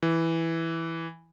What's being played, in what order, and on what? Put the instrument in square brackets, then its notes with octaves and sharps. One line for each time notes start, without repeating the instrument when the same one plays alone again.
[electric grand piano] E3